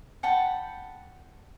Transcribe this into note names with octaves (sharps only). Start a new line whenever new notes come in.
F#5 G5 A5 B5